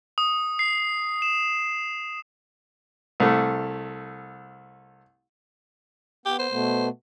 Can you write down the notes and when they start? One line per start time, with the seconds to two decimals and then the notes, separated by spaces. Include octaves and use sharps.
0.18 D#6
0.59 C7
1.22 E7
3.20 C2 A3
6.26 B3 G4
6.39 C5
6.50 B2 A3 B3